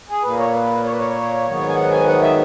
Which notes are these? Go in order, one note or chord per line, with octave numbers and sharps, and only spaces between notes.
G#4
A#2 A#3 B4
C#5
B4
C#5
B4
C#5
G#2 D#3 F#3 B3
G#5
F#5
G#5
F#5
E5